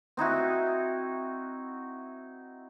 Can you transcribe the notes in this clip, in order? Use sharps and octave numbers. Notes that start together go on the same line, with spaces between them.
C4 D#4 E4 F#4